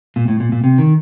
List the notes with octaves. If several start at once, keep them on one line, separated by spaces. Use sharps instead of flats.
A#2
A2
A#2
A#2
C3
D#3